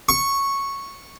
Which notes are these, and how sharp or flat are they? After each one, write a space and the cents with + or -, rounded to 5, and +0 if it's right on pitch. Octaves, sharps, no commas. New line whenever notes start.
C#6 -5